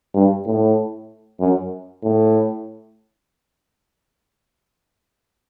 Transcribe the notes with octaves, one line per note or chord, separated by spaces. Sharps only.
G2
A2
F#2
A2